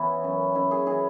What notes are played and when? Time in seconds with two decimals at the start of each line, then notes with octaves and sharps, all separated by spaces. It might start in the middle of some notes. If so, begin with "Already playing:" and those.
Already playing: E3 B3 C#4 E4
0.24 F#2
0.55 F#2 E4
0.71 G#4
0.86 E3 G#4